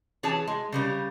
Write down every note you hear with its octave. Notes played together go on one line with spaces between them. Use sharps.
E3 G#4 C#5 G#5 A5
G#3
C#3 G3 A#4